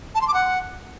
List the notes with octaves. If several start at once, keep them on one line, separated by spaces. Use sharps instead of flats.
A5
C6
D6
F#5